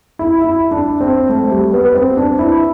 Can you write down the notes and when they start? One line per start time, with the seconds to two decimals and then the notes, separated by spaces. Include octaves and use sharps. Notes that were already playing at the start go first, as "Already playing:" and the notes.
0.19 E4
0.42 E4
0.71 D4
1.01 C4
1.29 A3
1.51 G3
1.73 B3
1.95 C4
2.17 D4
2.39 E4